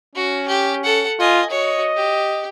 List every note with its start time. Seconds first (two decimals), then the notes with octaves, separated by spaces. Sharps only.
0.15 C#4 F#4
0.48 G4
0.84 A4 F#5
1.20 F4 D#5 G#5
1.50 F#4 C#5 D#5
1.96 G4